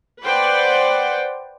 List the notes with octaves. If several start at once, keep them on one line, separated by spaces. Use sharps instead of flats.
B4 C5 D5 F#5 G5